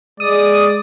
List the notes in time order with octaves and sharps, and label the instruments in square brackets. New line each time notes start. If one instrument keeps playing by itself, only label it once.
[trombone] G#3 [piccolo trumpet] D5 [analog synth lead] D#6